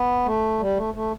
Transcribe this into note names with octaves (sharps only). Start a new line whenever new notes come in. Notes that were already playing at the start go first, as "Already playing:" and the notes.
Already playing: B3
A3
G3
A3
A3